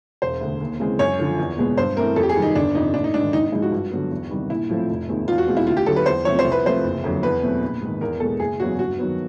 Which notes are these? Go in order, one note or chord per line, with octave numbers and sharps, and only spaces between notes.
E1 C5
D2 D3
D#2
C#3 E3 G#3 C4
F#2 C#5
D3 F3
E2
B2 G#3 B3
G2 C5
E3 A3 C4 A#4
F2 A4
G4
G#4
C3 D#3 G3
D#4
G1 D4
F2 C3 D#4
A1 D4
D#4
G#2 D#3 D4
G#1 D#4
D#4
G#2 F3 G#3 E4
F#4
G2
D3 F#3 B3
E2
C3 D#3 G3
A#1 E4
A2 F3 A3 C4
F1
D#2 D#3 G#3 C4
E2 F4
F#4
B2 G#3 C4 F4
E4
D2 F4
G4
D3 F#3 A4
B4
E2 C5
C3 F3 A3 C4 C#5
C5
C2
B4
C3 F3 A3 C5
F#1
F2 D3 F#3
E2 B4
B2 F#3 A3 C4
A#1
G#2 D#3
E2 A#4
B2 G#3 A4
F#1 G#4
E2 C#3 F#3 B3 F#4
G2 F#4
D#3 F#3 B3